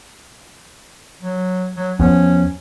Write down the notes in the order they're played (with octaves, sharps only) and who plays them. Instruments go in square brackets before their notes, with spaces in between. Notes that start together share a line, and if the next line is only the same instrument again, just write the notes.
[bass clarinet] F#3
F#3
[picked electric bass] E2 F3 B3 [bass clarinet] C#4